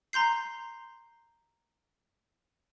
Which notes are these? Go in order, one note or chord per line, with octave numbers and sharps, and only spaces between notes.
A#5 C6 G6 C7